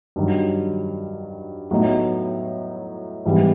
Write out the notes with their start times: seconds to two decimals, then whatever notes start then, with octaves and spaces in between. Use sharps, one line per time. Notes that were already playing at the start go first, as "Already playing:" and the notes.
0.16 G2 D#3 F#3
1.71 A2 F#3 B3 D#4
3.25 G#2 E3 G3 B3